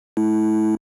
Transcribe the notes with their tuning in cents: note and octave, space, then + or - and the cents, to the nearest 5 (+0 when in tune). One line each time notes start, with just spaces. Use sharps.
A3 -35 E4 -20